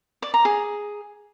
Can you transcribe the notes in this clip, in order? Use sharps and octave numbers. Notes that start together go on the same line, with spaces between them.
D5
A#5
G#4